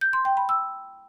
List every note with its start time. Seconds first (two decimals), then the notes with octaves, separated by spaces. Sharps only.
0.01 G6
0.13 C6
0.25 G5
0.37 B5
0.49 E6